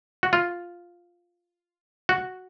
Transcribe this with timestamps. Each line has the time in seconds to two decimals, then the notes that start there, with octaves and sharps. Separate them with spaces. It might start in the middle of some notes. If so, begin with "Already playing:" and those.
0.23 F#4
0.33 F4
2.09 F#4